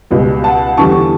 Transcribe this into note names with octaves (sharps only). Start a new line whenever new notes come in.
C#2 B2 G3
F#5 A5
E2 D3 G3 A5 C#6